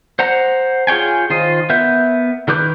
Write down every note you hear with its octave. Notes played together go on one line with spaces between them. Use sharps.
C5 F#5 A#5
F4 G#4 C#5 G5 G#5
D#3 F4 C5 D#5
B3 A#4 E5 G6
D#3 A#4 B4 D6 G6